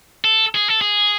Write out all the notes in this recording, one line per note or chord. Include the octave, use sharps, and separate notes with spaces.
A4
G#4
A4
G#4